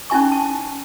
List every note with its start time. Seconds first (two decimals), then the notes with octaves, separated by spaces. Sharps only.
0.10 C#4 D#4 E4 G#5 C#6
0.32 A5